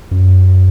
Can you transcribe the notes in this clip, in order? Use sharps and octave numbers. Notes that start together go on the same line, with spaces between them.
F#2